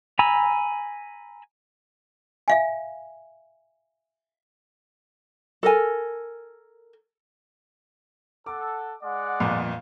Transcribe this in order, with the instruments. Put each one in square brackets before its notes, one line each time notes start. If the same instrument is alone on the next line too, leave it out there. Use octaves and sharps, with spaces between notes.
[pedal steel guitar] G#5 A#5 B5 E6
[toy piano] E5 F5 G#5
[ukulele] A4 A#4 G#5
[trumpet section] A4 F#5 [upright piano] D6
[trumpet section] G#3 D5 F#5
[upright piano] G1 F2 A#2